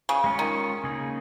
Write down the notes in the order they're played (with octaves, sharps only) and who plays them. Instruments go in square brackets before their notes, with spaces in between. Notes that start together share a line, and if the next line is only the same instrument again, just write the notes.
[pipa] C#3
[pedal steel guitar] G#3 C#4 F4
[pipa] D#3
[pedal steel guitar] C#3 A#3 D#4 G#4